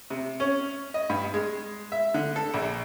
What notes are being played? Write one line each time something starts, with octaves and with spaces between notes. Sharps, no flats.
C3
C#4
D#5
G2
G#3
E5
D3
A4
A#1